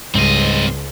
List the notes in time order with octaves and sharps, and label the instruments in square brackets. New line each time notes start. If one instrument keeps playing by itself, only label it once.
[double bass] C#2 [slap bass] G#2 G3 [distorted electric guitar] C4 D#5